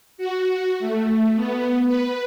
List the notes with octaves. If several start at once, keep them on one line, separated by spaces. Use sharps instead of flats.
F#4
A3
B3
B4